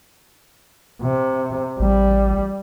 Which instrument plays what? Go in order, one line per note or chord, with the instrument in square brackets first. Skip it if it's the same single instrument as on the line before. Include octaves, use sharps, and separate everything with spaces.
[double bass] C3
[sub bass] A1 [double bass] G3